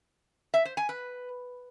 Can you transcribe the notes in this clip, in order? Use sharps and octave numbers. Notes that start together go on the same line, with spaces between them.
E5
C5
G#5
B4